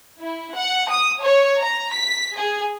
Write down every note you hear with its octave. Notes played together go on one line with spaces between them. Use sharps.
E4
F#5
D#6
C#5
A#5
B6
G#4